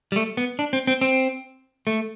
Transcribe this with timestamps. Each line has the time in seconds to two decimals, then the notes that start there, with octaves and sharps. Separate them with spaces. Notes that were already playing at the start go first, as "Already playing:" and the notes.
0.12 G3
0.16 A3
0.37 B3
0.59 D4
0.73 C4
0.87 C4
1.01 C4
1.87 A3